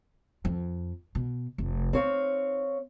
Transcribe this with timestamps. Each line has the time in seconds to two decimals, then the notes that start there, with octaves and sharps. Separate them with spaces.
0.45 F2
1.15 B2
1.58 F1
1.93 C4 D#4 C#5 F5